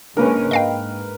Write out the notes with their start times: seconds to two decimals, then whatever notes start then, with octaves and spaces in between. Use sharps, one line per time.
0.17 C#3 G#3 A#3 C#4 D4 A#4 B4
0.51 G#2 D#5 F5 G5